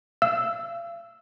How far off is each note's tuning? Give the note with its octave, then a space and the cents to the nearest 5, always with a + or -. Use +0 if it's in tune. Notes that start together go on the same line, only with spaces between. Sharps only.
F5 -40 E6 +0